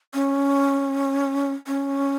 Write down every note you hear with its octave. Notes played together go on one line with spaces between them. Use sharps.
C#4
C#4